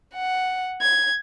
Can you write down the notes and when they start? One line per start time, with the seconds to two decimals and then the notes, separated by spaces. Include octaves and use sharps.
0.15 F#5
0.82 G#6